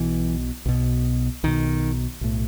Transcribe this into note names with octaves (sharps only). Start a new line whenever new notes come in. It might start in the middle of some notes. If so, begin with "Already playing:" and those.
Already playing: B1 B2 E3
B1 B2
B1 B2 D#3
B1 A2